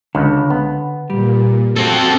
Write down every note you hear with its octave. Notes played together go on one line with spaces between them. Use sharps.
C#2 D3
B3
A#2 G3
C4 F#4 A4